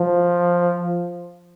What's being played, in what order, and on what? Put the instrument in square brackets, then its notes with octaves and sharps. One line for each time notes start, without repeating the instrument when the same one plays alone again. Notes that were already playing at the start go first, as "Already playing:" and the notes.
Already playing: [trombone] F3